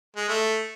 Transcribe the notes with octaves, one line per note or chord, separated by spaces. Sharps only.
G#3
A3